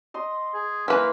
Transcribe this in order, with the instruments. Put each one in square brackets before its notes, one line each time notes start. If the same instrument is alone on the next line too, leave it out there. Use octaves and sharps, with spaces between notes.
[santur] D#5 C6
[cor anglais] G#4
[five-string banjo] E3 B4 [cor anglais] A#3 [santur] C6